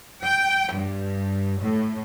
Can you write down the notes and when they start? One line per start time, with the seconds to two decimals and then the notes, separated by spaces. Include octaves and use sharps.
0.24 G5
0.73 G2
1.61 A2